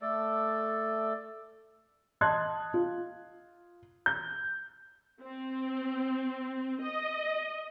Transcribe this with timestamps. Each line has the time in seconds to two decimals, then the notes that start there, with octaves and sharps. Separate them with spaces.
0.02 A3 A4 D5
2.21 D#5 A5 C6 F#6 G#6
2.74 F4
4.06 G6
5.21 C4
6.81 D#5